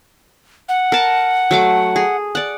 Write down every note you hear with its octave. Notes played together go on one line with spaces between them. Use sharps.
F#5
A#4 A5
F#3 A3 D6
G#4
D5 F#5